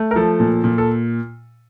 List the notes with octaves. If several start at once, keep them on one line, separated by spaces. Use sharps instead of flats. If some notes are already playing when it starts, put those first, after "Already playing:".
Already playing: A3
A#4
F3 A4
A#2
A#2
A4